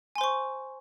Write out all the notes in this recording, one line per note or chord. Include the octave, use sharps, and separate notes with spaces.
C5 G#5 C6 C#6